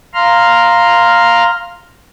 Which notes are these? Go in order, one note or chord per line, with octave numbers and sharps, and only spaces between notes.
F5 A#5 C6 F6